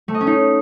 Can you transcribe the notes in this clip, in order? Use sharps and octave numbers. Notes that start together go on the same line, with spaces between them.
A3
D#5
C#4
D#4